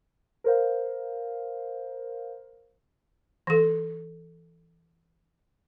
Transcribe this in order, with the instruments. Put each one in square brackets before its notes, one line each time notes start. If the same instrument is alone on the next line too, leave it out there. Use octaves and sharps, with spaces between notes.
[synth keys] A#4 C5 F5
[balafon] E3 A4